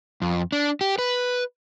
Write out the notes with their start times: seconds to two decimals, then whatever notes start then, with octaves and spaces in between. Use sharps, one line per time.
0.22 F2
0.52 D4
0.81 G4
0.99 B4